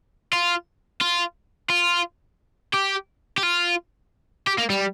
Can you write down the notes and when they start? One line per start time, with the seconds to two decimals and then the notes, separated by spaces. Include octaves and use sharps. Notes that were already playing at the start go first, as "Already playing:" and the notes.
0.33 F4
1.01 F4
1.70 F4
2.74 G4
3.38 G4
3.43 F4
4.47 G4
4.58 A#3
4.70 G3